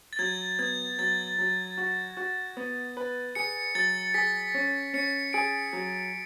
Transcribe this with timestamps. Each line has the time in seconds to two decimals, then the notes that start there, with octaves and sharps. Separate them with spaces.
0.13 A6
0.19 F#3 G#6
0.59 B3 G#6
0.98 F#3 A6
1.39 F#3
1.78 F#4
2.17 F#4
2.57 B3
2.97 B4
3.35 G#4 C#7
3.75 F#3 A6
4.14 G#4 B6
4.54 C#4
4.94 C#4 C#7
5.33 G#4 D7
5.73 F#3